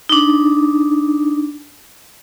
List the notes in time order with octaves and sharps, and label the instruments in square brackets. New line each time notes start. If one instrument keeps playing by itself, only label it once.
[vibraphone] D4 D#4